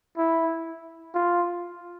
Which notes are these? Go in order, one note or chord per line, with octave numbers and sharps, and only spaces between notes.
E4
F4